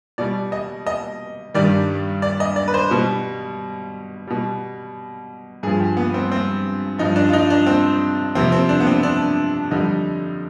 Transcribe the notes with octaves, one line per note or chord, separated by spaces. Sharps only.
B2 G3 D5
D#5
D#5
G2 D#3 G3 D5
D5
D#5
D5
B4
C5
B2 G3
B2 G3
G2 F3 G#4
G4
B3
C4
C4
G2 F3 D#4
D4
F4
D#4
D4
C4
F2 C3 F3 C4
C4
D4
B3
C4
D4
F2 D3 G3 D#4